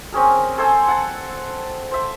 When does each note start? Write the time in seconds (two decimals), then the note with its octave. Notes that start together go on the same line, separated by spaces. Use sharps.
0.13 C4 C#4 G#4 A#4
0.58 A4 C5 G#5 E6
0.88 F#5 A5
1.92 C5 E5